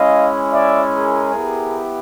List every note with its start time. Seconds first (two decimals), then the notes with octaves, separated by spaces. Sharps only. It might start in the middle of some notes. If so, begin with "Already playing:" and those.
Already playing: G#3 C#4 E4 D#5 F5
0.52 D5 E5
0.93 G#4 A#4
1.35 B3 E4 G4